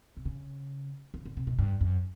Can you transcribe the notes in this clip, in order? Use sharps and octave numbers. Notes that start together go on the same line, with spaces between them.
C3
C#3
D3
D3
C3
B2
G2
F#2